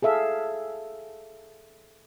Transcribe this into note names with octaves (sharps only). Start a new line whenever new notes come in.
G#4 A4 E5 F5